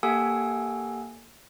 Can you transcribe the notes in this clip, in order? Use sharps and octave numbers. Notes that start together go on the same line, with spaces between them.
A#3 G4 A4 F#5 G#5 E6